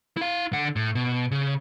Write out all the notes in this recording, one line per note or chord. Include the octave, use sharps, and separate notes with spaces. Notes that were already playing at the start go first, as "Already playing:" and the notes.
E4 F5
D3 F#5
A2
B2
C#3